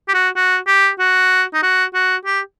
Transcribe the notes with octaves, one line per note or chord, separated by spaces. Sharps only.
G4
F#4
F#4
G4
F#4
D#4
F#4
F#4
G4